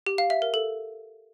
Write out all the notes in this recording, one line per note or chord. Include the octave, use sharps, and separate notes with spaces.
G4
F5
E5
A#4
A4